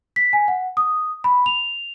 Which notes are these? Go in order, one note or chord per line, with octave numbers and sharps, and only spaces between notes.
B6
G#5
F#5
D#6
B5
F7